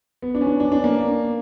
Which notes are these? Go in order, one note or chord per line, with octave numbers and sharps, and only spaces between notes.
B3
D4
C#4
D4
D4
D4
A#3